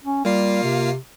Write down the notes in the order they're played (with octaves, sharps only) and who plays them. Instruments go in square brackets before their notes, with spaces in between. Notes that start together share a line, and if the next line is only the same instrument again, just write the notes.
[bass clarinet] C#4
[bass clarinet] G3 [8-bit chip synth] A#3 F4 C7
[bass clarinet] C3